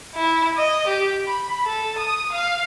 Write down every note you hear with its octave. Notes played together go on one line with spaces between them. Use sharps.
E4
D#5
G4
B5
A4
D#6
F5